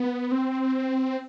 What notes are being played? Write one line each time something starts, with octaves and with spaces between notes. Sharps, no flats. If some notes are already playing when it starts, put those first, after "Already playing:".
Already playing: B3
C4